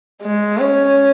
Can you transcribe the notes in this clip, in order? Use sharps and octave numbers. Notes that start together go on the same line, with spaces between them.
G#3
C#4